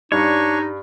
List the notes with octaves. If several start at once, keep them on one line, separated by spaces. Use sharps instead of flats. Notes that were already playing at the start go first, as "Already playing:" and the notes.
G2 D4 D#4 C#5 C#6